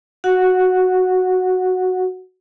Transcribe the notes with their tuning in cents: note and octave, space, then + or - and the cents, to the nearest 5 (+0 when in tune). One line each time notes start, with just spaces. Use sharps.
F#4 +0 F#5 -15